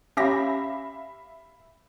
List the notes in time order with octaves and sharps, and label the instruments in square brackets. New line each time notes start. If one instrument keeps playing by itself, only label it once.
[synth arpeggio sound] C#4 G4 A#6 [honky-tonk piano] E5 F5 B5